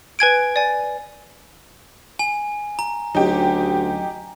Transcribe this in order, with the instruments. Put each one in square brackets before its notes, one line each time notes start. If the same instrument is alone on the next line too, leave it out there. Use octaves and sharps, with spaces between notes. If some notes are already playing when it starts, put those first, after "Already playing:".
[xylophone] B4 G#5 G#6 D7
D5 G#5
[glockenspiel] G#5
A#5
[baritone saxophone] D2 [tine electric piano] F#3 C#4 [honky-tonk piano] D#4 G4